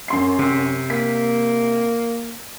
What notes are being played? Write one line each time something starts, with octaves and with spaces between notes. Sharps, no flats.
F#2 C6 C7
C3
A#3 B6